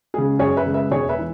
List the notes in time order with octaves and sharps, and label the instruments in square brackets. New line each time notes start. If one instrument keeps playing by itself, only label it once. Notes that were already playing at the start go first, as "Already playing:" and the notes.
[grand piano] C#3 G#3 G#4
F#2 G#4 C#5
B4 E5
C#3 G#3
B4 E5
E1 G#4 C#5
B4 E5
E3